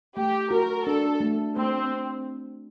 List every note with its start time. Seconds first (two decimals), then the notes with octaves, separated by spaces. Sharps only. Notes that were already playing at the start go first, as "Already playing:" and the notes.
0.17 A3 G4
0.51 F#4 A#4
0.85 D4 A4
1.20 A3
1.56 A3 C4